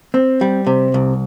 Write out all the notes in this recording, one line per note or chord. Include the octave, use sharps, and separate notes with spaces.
C4
G3
C3
C2